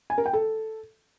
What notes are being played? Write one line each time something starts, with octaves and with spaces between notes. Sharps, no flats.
G#5
A#4
G5
A4